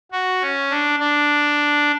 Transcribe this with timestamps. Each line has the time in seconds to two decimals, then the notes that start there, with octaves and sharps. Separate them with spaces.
0.12 F#4
0.42 C#4
0.70 D4
0.99 D4